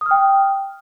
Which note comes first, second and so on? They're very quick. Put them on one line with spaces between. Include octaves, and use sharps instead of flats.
D#6 F6 G5